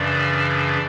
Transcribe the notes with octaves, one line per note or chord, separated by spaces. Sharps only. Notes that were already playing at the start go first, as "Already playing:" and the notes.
Already playing: F#2 C#3 E3 D4 D5